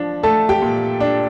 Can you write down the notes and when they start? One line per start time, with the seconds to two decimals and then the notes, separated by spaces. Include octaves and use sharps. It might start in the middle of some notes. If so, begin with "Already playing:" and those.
Already playing: F3 D4
0.23 A3 A4 A5
0.49 G4 G5
0.62 A#2
1.00 D4 D5